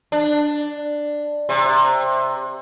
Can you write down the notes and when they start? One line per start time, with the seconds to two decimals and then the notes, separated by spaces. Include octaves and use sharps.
0.12 D4
1.49 C3